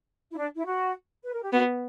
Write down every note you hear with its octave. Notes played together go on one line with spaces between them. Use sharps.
E4
D4
E4
F#4
B4
A#4
G4
B3 F#4